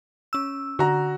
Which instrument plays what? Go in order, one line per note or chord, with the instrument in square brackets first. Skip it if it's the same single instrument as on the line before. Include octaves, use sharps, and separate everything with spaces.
[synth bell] C#4 E6
[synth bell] D3 [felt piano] F#4 A#5